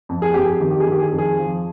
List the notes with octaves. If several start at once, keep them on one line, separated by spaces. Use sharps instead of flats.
F2
G#4
F2 G4
G#4
D#3 G4
G4
G#4
D#3
G4
G#4
F2
G#4
F3